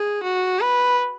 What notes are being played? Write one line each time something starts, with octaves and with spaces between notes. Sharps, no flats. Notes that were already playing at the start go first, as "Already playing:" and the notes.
Already playing: G#4
F#4
B4